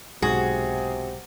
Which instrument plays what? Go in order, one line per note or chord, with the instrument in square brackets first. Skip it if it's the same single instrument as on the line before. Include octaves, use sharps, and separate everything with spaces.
[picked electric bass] B1 G#2 [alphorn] C3 [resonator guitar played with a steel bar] F#4 [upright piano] G#4